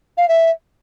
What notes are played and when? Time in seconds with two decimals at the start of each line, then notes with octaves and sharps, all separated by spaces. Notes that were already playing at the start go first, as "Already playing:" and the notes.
0.17 F5
0.28 E5